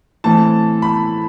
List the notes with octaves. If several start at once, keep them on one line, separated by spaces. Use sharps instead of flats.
A2 E3 A3 C4 A5
B5